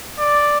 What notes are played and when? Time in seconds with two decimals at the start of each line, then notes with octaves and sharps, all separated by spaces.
0.19 D5